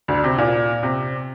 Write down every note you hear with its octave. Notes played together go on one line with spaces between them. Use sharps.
D2 D3
C3
A#2
C3